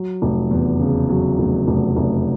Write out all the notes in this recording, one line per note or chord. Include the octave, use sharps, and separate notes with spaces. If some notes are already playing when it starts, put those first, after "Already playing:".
Already playing: F#3
F1
E2
C#3
F#3
F1
F1
F1